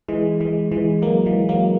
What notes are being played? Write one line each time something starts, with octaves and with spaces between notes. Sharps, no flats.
E3 G#3
E3 G#3
E3 G#3
F#3 A#3
E3 G#3
F#3 A#3